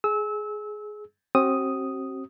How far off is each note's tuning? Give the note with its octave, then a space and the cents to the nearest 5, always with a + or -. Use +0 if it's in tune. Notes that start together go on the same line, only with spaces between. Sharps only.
G#4 +15 E6 -25
C4 +35 F#4 +40 D#6 +0